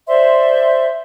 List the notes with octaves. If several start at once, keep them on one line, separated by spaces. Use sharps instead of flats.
C5 D5 E5 C6